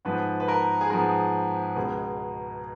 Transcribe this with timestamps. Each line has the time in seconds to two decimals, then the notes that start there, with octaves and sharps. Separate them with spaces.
0.05 G#2 F3 B3 B4
0.40 B4
0.48 A#4
0.81 G#4
0.90 G#2 F3 B3 A#4
1.76 C#2 B2 G#3